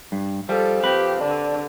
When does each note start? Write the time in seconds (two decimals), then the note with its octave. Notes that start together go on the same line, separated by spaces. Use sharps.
0.12 G2
0.49 F3 G3 A4
0.84 C4 G4 B4
1.21 D3 D4